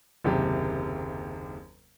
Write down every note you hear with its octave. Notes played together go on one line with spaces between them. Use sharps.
F#1 D#2 C3 G4